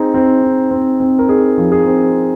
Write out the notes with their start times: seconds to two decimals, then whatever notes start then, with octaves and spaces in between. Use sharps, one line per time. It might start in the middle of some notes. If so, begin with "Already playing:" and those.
Already playing: C4 D#4 G#4
0.14 C4
0.42 D#4
0.71 C4
1.00 C4
1.19 A#4
1.29 D#4 G#4
1.58 F3
1.72 G#4
1.87 C4